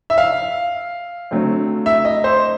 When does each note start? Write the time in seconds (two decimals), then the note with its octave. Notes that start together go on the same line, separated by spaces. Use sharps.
0.10 E5
0.18 F5
1.31 D3 F#3 A3 C4
1.86 E5
2.05 D#5
2.24 C5